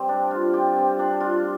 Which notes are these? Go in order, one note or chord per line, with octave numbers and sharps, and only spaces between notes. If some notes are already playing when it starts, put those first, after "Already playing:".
Already playing: G3 C4 G4
D4
F4
G4
C4
D4
F4